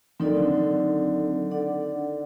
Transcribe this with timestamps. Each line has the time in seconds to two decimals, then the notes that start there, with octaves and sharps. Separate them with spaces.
0.20 D#3 F#3 C4 D#4 A4 D5
0.36 D3
1.51 D4 A4 D5 F#5